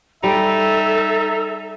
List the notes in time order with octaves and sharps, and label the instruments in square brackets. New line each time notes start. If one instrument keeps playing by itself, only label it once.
[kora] G3 G5 [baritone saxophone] D#4 [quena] A4 [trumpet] E5